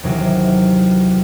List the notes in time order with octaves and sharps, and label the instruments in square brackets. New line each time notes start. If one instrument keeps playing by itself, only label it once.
[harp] D#2 C3 E3 F#3